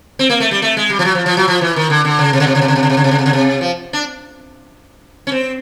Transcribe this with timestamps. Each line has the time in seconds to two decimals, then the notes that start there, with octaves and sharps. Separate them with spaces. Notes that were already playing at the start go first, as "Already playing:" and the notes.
0.19 C4
0.30 A#3
0.40 A3
0.51 G3
0.62 A3
0.77 G#3
0.90 G3
0.99 F3
1.05 F#3
1.15 F3
1.26 F3
1.37 F#3
1.48 F3
1.61 E3
1.76 D#3
1.90 D3
2.05 D3
2.19 C#3
2.33 C3
2.40 C#3
2.47 C3
2.55 C#3
2.61 C3
2.68 C#3
2.76 C3
2.83 C#3
2.90 C3
2.97 C#3
3.04 C3
3.11 C#3
3.18 C3
3.26 C#3
3.33 C3
3.61 F3
3.93 D4
5.27 C#4
5.32 C4